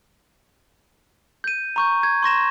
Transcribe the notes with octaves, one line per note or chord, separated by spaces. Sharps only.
G6 D#7
A#5 C#6 G6
G#6
C6 C#6 A#6 E7